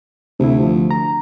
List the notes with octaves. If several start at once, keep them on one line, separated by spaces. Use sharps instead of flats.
D2 C3 E4
F3
A#5